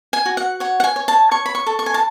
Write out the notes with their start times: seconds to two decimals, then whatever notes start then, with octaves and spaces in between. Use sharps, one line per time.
0.13 G#5
0.26 F#4
0.37 F#5
0.60 C#5 F#5
0.80 F#5
0.84 G#5
0.96 C#5
1.08 A5
1.31 C#5 C#6
1.46 B5
1.55 C#6
1.66 A4
1.79 C#6
1.86 G#5
1.94 A5